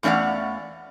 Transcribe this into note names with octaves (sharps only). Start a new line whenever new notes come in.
E2 A3 C#4 D5 F5 F#5